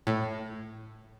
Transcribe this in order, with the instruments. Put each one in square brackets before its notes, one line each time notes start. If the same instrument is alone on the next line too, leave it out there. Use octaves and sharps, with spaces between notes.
[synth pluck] A2